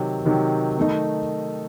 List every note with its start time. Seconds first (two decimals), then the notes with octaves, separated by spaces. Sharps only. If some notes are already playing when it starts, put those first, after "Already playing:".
Already playing: C3 D#3 F#3
0.26 C3 D#3 F#3
0.78 D#3 A3 D#4